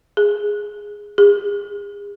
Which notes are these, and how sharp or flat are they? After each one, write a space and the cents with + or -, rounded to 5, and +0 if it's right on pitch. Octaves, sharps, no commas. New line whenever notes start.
G#4 -5
G#4 -35